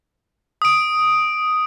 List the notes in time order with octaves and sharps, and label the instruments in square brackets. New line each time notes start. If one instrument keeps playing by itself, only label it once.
[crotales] D#6 D7